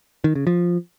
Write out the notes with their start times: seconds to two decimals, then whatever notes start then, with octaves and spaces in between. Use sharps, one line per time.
0.24 D#3
0.35 C#3
0.47 F3